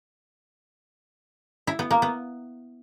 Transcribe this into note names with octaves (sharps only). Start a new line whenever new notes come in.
E4
B3
A#3
B3